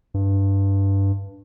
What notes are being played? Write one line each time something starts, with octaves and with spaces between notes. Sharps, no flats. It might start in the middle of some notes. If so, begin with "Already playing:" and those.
G2